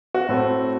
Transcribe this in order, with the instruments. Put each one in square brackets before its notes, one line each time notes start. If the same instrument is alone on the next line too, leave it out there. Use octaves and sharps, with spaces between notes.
[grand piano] F#4
A2 A3 C4